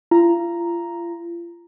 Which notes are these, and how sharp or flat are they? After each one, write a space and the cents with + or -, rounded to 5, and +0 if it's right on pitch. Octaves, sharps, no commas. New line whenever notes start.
F4 -35 A#5 +0